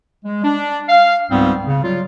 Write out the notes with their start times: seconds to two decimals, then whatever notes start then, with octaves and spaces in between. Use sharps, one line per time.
0.25 G#3
0.44 D4
0.89 F5
1.31 C#2 G#2 G3 B3 C4
1.67 C#3
1.83 F#3 G3 F4